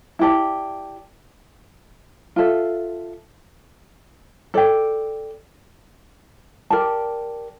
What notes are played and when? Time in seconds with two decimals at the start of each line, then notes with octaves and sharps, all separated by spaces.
0.19 E4 G4 D5 A5
2.36 F4 A4 E5
4.54 A4 D5 G5
6.70 G4 A#4 D5 A5